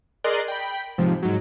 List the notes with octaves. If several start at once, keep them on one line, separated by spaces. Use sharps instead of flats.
G#4 A#4 D5 D#5 C6 F#6
G5 B5
G#2 C3 F3
G#2 F#3